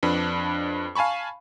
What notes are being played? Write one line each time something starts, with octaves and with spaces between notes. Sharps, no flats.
F2 D4 B4 B5
F5 G#5 A5 B5 C#6